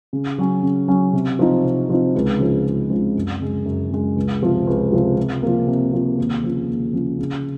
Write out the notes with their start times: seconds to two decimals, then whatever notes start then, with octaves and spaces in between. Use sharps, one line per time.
0.13 C#3
0.38 F#3 C#4
0.63 C#3
0.88 F#3 C#4
1.13 C3
1.39 F3 C4 D#4
1.64 C3
1.89 F3 C4 D#4
2.15 C#2
2.39 C#3 F3 G#3 C4
2.66 C#2
2.90 C#3 F3 G#3 C4
3.15 F#2
3.40 C#3 G#3
3.65 F#2
3.90 C#3 G#3
4.16 C#2
4.42 C3 F3 C4
4.67 C#2
4.92 C3 F3 C4
5.17 C3
5.43 F3 A#3
5.67 C3
5.93 F3 A#3
6.18 D#2
6.44 C#3 F3
6.68 D#2
6.93 C#3 F3
7.19 C#3